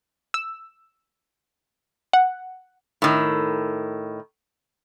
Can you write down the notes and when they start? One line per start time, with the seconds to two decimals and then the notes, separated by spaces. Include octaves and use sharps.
0.34 E6
2.13 F#5
3.02 A2 D#3